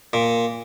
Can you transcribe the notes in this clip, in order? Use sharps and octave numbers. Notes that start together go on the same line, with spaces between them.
A#2